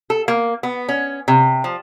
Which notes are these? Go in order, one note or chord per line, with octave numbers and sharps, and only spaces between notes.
A4
A#3
B3
C#4
C3
F3